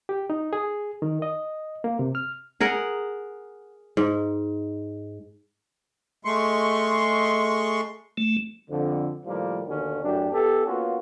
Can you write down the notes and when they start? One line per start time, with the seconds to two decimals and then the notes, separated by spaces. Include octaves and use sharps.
0.09 G4
0.30 D#4
0.53 G#4
1.02 D#3
1.22 D#5
1.84 A#3
1.99 C3
2.15 F6
2.60 G#4 A#4 F#5
3.97 G#2
6.25 G#3 A3 C6 C#6
8.18 A3
8.70 F2 D3
9.25 A2 D#3 F3 G3 A#3
9.66 D#2 B2 D3 D#3 C#4
10.03 F#2 A2 D4 G4
10.33 B3 E4 G4 A4
10.66 A#3 B3 C#4 F4 F#4